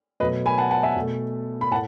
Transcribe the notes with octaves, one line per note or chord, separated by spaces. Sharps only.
B2 F#3 A3 B4 D#5
G#5 B5
F#5 A5
F#5 A5
E5 G#5
B2 A3
B5
A2 F#5 A5